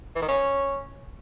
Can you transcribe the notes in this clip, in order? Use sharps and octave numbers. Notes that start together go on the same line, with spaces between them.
E3
D#3
C#4